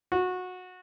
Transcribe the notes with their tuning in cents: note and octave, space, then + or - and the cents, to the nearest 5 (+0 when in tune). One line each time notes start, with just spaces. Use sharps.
F#4 -20